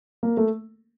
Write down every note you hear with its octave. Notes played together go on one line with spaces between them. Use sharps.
A#3
A3